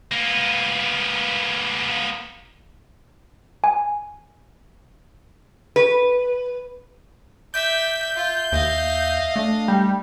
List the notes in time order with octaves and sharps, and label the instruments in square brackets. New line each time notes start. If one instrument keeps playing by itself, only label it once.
[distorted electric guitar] A#3 B3
[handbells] G#5
[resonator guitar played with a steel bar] B4
[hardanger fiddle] D5 E5 [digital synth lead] G6
[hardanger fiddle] F4 [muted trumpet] E5
[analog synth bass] D#2 [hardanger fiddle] D#5 F5
[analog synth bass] A3 [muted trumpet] D4
[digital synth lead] G3